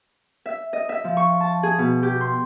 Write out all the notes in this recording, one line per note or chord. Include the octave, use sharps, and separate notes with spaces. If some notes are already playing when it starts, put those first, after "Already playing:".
E5
D#5
E5
F3
C#6
A5
G#4
B2
G4
C6